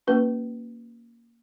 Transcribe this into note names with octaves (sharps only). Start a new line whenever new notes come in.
A#3 C#4 F#4 B4